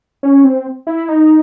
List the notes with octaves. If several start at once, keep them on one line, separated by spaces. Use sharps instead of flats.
C#4
C4
E4
D#4